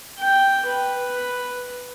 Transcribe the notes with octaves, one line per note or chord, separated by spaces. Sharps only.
G5
B4